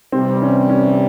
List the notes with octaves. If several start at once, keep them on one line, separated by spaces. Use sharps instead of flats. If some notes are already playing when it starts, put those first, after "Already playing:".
C3 E3 G3 C4
C#4
C#4